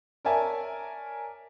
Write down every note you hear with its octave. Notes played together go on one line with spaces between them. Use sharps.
A#4 C#5 D5 E5 G#5 A5